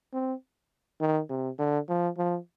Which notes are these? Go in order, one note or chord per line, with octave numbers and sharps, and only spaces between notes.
C4
D#3
C3
D3
F3
F3